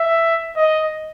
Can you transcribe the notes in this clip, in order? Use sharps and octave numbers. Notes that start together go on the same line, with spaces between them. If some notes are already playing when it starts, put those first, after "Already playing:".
Already playing: E5
D#5